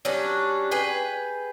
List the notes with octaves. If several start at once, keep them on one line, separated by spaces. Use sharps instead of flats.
F#3 G3 C#4 D4
G#4 B4 G5